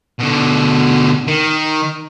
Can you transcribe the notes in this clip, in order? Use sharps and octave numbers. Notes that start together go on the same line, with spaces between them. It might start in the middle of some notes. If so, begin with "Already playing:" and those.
B2 D3
D#3